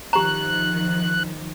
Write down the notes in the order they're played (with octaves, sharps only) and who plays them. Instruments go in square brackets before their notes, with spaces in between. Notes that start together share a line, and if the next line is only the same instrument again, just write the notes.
[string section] D#3 F3 [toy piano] G4 A#5 [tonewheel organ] F#6